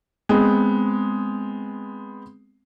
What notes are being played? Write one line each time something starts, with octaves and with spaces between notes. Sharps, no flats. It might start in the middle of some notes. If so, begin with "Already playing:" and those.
G#3 B3 C4